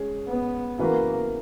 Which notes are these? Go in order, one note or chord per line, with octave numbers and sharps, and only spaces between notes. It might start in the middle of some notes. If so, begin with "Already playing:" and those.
Already playing: G#3 C#4 G#4
B3
C#3 E3 A#3 B3 F#4 B4